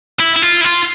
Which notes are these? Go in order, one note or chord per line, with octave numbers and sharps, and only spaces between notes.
E4
E4
F4
E4
F4